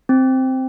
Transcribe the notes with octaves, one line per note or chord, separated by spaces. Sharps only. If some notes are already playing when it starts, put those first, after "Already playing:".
C4